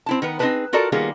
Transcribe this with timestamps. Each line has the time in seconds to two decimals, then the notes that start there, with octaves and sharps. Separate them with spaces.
0.06 C4 E4 A5
0.22 D#3 B3 B4
0.39 C4 D#4 F#4 G#4 B4 A5
0.73 F4 F#4 A4 A#4 D5 A5
0.92 D#3 G3 A#3 B3 F4 G#4